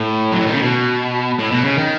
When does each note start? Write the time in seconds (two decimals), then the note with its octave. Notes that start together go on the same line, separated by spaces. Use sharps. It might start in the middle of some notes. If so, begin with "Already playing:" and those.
Already playing: A2
0.32 F#3
0.39 E3
0.47 D#3
0.54 C#3
0.62 B2
1.39 A2
1.51 B2
1.64 C#3
1.77 D#3